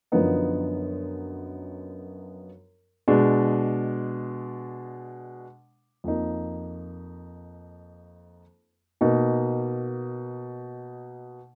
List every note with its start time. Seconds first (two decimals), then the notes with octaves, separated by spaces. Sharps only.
0.12 F#2 D3 F3 B3 D#4
3.08 B2 G#3 D4
6.04 F2 F3 A#3 D#4
9.01 B2 A#3 D#4